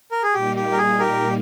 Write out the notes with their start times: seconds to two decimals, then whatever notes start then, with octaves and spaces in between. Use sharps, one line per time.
0.12 A#4
0.23 G#4
0.34 A#2 G3 A#3 D#4 G4
0.56 G4
0.72 A#4
0.78 G#4
0.99 G4 A#4